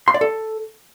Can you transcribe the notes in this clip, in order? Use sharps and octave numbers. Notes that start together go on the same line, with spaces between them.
C6
D5
A4